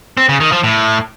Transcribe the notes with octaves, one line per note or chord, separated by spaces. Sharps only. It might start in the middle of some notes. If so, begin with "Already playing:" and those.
C4
C#3
D#3
F3
A2